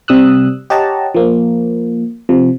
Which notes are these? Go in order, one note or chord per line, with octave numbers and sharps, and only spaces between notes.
C3 G3 D#6 E6 F#6
G4 C#5 D#5 F#5 A5 A#5
F3 A#3
C3 F3